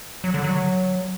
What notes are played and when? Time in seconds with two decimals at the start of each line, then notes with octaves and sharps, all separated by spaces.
0.24 F#3
0.34 D3
0.44 F#3